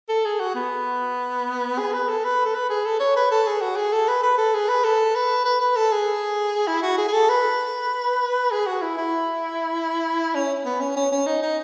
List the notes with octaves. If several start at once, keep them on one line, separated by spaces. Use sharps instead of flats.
A4
G#4
F#4
B3
G#4
B4
A4
B4
A4
B4
G#4
A4
C#5
B4
A4
G#4
F#4
G#4
A4
B4
B4
A4
G#4
B4
A4
B4
B4
B4
A4
G#4
E4
F#4
G#4
G#4
A4
B4
G#4
F#4
E4
E4
C#4
B3
C#4
C#4
C#4
D#4
D#4